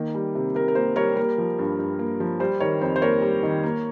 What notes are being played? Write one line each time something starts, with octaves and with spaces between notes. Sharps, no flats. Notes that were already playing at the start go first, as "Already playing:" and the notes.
Already playing: D#3 A#3
G3
C3
C3 A#4
A#4
A#3 C5
G3 A#4 C#5
A#3 A#4
F3
G2
G2
A#3
F3
G3 C5
D#3 A#4 C#5
F2 C5
C5
A#3 A#4 C#5
G3
D#3
A#3